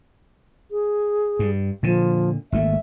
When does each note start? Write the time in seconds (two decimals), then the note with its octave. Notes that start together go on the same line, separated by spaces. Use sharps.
0.71 G#4
1.39 G2
1.83 A#2 D3 F3
2.52 G#1 A3 A#3 E5